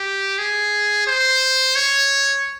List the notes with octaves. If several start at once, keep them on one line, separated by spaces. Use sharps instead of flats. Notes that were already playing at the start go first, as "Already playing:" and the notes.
Already playing: G4
G#4
C5
C#5